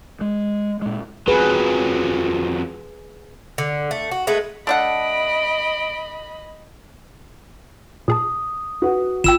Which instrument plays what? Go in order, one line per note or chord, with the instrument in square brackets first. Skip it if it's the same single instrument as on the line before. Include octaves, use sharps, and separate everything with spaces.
[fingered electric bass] G#3
A#2 G#3
[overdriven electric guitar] F2 F#3 [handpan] G#4 B4
[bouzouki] D3
A3
F#4
G#3 A3 B4
[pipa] A3 D4 F#5 [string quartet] D#5 B5 [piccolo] D7
[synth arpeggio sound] A#2 G#4 A5 [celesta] D#6
[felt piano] F#4 B4 F#5
[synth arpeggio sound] G1 G5 [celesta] F4 [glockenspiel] E6 E7